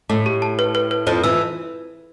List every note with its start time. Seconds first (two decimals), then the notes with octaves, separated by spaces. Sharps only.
0.09 A2 A3 D6
0.26 G4
0.42 A5
0.59 B4
0.75 B4
0.91 B4
1.07 F2 F3 C5
1.24 E3 E6